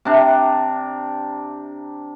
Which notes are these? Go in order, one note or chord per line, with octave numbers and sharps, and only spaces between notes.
C3 D4 A#5